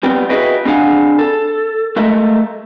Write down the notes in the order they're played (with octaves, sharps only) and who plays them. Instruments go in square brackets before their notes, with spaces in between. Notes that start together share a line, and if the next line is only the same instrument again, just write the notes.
[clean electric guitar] G3 B3 C4 G5
E4 F#4 G#4 B4 D#5 G5
C4 D4 G#4 F5 F#5 G#5
A4
G#3 A3 A4 A#4 D#5 E5